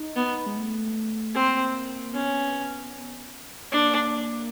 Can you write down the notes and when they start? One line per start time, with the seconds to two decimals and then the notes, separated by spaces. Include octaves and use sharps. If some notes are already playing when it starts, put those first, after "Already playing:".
Already playing: D#4
0.16 B3
0.46 G#3
0.56 A3
1.34 A#3 C4
2.14 B3 C#4
3.72 A#3 D4